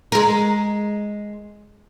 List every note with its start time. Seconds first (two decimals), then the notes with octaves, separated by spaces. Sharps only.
0.12 G#3 A#4